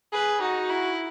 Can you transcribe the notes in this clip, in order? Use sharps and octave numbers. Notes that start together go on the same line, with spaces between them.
G#4 B4
D#4 F#4
E4